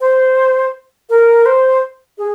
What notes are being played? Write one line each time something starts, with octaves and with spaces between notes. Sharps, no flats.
C5
A#4
C5
G#4